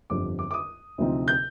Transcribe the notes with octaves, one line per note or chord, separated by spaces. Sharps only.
G1 F2 D3 G3 D6
D6
D6
D#6
D2 C3 F3 C4 D#4
G6